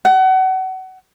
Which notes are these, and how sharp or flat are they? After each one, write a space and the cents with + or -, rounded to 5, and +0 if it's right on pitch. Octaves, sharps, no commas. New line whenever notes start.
F#5 +30